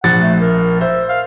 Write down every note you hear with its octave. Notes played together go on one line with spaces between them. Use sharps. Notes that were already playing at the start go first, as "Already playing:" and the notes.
A#1 F#5 A6
A3
A#4
C5 E5
F5